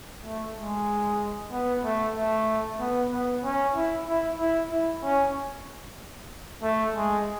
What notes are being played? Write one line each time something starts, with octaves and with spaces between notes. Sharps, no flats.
A3
G#3
B3
A3
A3
B3
B3
C#4
E4
E4
E4
E4
C#4
A3
G#3